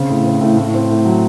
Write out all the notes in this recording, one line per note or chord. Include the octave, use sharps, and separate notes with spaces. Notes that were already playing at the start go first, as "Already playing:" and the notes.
Already playing: C#3 C4
A2
C4
A2
A2
C4
A2
F#3